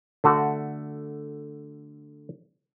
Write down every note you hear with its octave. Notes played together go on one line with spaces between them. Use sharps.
D3 A3 F#4